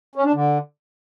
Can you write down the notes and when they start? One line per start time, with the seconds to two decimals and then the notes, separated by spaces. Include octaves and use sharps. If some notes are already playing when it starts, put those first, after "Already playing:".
0.15 C#4
0.25 D4
0.34 D3